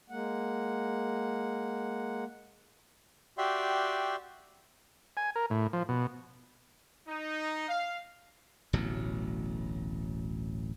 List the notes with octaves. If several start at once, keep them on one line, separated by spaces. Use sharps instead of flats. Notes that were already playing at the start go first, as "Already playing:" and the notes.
G#3 A#3 F#5
F#4 G4 D5 E5 G5 C6
G#5
A#4
A2
F3
B2
D#4
F5
D1 A1 B2 F#3